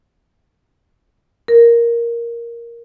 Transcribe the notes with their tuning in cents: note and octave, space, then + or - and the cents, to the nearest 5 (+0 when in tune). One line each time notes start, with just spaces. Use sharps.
A#4 +5